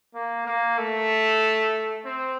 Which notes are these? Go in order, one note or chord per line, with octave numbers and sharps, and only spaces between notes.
A#3
A#3
A3
C4